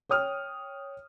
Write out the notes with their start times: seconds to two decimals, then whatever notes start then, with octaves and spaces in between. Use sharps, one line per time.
0.09 C#5 G5 D#6 F6